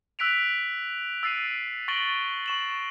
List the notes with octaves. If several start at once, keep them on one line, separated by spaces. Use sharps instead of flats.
E6 F#6 B6 D7 F7
E6 A6 C7 D7 D#7
C#6 A6 A#6 D7 F#7 G7
C#6 E7 F#7